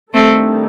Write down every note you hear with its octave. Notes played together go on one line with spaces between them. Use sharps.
D#3 G3 A3 C4 D4 A4